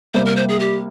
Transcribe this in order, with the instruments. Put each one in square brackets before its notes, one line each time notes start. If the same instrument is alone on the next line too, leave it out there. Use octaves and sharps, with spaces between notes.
[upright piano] C3 G3 A#3 [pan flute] C5
[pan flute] A#4
C5
G#4
G4